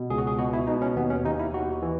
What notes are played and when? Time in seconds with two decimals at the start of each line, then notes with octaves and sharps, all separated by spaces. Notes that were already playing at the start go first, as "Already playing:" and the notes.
Already playing: B2
0.10 C#2 G#4
0.18 F#4
0.27 G#4
0.38 B2 F#4
0.53 E4
0.67 B2 D#4
0.82 C#4
0.96 D#2 B3
1.10 C#4
1.25 D#2 D#4
1.39 E4
1.54 D#2 F#4
1.82 E3